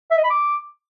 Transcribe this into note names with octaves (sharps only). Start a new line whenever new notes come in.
E5
D#5
B5
D6